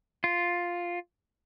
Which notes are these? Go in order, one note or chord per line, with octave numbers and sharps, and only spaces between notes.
F4